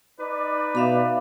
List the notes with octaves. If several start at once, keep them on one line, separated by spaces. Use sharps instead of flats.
D#4 B4 D5
B2 E5 F5 B5